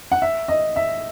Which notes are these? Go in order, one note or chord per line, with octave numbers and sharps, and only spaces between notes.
F#5
E5
D#5
E5